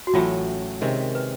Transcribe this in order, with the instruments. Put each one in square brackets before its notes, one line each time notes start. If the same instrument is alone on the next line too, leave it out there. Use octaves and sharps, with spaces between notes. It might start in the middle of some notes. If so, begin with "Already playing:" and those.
[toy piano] F#4
[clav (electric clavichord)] A1 A2 F#3 A3 [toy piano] F4
[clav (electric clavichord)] C3 D#3 G#3 C#4 [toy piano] A#4
[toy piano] B4